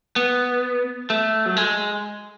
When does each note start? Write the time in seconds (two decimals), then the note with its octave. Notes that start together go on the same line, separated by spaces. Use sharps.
0.16 B3
1.10 A3
1.46 F#3
1.57 G#3